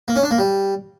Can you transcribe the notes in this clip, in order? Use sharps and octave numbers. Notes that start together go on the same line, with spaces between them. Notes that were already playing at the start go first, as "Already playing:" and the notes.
A#3
C#4
D4
A#3
G3